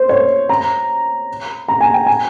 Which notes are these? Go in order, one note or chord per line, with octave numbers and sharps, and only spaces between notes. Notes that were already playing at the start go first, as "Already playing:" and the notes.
Already playing: C5
C#5
A#5
A#5
G#5
G5
G#5